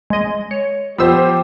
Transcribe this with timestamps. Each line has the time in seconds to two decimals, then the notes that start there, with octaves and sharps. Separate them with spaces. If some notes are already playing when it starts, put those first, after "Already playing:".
0.10 G#3 D#5
0.51 C#5
0.98 F3 B3 G4 C5 E6